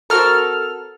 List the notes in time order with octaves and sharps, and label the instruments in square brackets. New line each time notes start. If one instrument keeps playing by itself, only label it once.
[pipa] C4 F#4 A#4 [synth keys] A4 F6